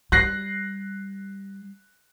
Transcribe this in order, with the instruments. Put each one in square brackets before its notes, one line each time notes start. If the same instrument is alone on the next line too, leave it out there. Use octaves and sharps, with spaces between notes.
[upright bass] G3 [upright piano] F#6 A#6 C7